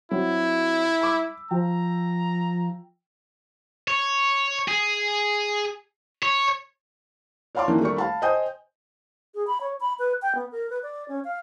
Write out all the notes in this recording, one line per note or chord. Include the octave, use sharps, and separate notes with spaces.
F#3 C4 E4
B5 D6 E6
F3 G5 A#5
C#5
G#4
C#5
C#5 D5 F5 A5 C6 D6
D#3 E3 A#3 D4 E4
G3 A3 D4 A#4 D5 C#6
F5 A5 B5
C5 D#5 G5 G#5 D#6 G6
G#4
B5
C#5
B5
B4
G5
B3
A#4
B4
D5
C#4
F5